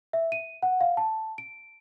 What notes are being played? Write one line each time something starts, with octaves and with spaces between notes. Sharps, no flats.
E5
D#7
F#5
F5
A5
D7